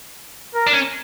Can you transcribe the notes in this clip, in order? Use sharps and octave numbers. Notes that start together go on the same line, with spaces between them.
A#4
D4
C#4